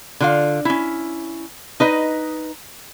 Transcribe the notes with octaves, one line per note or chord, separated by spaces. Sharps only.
D3 F4 F5
C#4 E4
D#4 B4 D#5